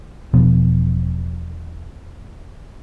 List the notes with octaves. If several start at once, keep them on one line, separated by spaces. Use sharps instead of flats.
E1 B2 F3 B3